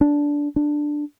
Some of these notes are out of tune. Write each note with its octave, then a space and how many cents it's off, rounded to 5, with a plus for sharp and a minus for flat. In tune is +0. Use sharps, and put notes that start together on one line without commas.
D4 -10
D4 +5